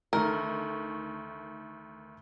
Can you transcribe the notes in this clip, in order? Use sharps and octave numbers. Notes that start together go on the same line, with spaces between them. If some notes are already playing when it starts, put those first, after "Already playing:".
D2 D#3 A3 A#4